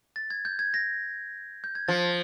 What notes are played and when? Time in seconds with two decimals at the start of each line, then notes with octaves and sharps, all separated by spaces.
0.16 A6
0.30 G#6
0.45 G6
0.59 G#6
0.74 A#6
1.64 G6
1.75 G#6
1.88 F3 A6